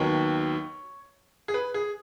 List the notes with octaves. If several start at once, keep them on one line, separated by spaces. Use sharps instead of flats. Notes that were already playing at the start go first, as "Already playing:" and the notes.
Already playing: D#2 D#3 F#3 B3 C#5
G#4
B4
G#4